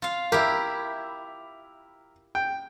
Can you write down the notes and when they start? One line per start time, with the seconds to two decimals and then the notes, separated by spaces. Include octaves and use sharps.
0.02 F4 F5
0.32 E4 G4 A#4 E5
2.35 G5